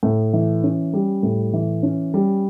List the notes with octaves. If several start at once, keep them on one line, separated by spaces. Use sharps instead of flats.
A2
E3
C#4
G3
A2
E3
C#4
G3